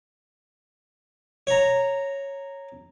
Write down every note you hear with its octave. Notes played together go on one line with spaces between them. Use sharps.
C#5 A#5